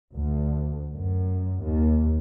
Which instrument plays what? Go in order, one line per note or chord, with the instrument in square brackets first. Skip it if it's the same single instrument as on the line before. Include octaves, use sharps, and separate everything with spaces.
[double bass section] D2
F#2
D#2